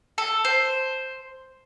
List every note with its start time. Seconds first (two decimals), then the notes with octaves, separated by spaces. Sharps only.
0.18 A4
0.45 C5